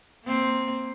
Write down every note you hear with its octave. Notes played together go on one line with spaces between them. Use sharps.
A#3 C4